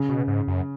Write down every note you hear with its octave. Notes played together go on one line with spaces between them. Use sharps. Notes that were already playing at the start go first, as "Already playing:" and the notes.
Already playing: C#3
B2
G#2
F#2